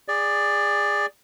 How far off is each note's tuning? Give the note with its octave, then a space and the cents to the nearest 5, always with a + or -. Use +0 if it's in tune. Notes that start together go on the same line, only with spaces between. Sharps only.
G#4 -20 D5 +5